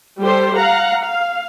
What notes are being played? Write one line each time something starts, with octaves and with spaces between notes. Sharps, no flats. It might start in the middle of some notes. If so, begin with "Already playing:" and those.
G3 G4 A4 C5
F5 F#5 A#5
F5